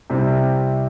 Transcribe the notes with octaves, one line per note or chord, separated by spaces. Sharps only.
C2 C3 G3 C4